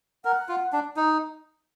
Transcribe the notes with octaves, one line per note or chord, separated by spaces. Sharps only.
A#4 F#5
F4
D4
D#4